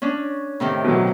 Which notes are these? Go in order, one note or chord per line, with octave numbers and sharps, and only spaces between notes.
C#4 D4
A2 C3 D#3
B2 F#3